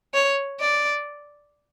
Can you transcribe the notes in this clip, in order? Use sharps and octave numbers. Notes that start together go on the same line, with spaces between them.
C#5
D5